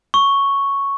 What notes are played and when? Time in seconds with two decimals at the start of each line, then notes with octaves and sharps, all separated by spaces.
0.14 C#6